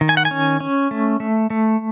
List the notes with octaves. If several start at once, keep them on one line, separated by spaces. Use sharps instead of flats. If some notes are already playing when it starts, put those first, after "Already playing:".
D#3
G#5
F#5
G#5
C#4
C#4
A3
A3
A3